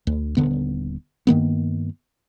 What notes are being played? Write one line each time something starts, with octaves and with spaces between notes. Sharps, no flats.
D2
D#1 D3 B3
G2 D#3 A#3 B3